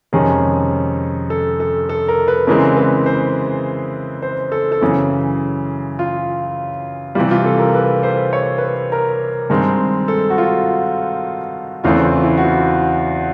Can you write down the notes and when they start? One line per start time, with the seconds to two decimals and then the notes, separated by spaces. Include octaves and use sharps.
0.13 F2 C3 D#3 G#3 C#4 G#4
1.30 A4
1.60 A4
1.89 A4
2.08 A#4
2.28 B4
2.47 C#3 E3 G#3 C4 A#4
2.77 B4
3.06 C5
4.22 C5
4.52 A4
4.72 A4
4.81 F#2 C#3 E3 G#4
5.99 F4
7.15 C3 E3 G3 F4
7.31 F4
7.45 A4
7.59 A#4
7.75 B4
8.03 C5
8.33 C#5
8.58 B4
8.62 C5
8.92 A#4
9.50 G2 D#3 G#3 C4
10.08 A4
10.30 F#4
10.38 F4
11.84 E2 C#3 E3 A3 C4 F4
12.04 F4
12.23 E4
12.38 F#4
12.43 F4